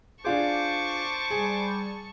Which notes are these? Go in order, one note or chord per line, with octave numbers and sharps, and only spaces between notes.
D4 F4 G#4 C5 A5 C#6 D6
G3 G#4